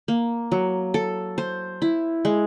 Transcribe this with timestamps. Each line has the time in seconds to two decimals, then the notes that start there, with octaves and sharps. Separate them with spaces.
0.08 A#3
0.52 F#3
0.94 A4
1.38 C5
1.82 E4
2.25 G#3